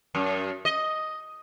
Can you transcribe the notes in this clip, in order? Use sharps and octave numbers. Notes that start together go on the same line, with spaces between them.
F#2
D#5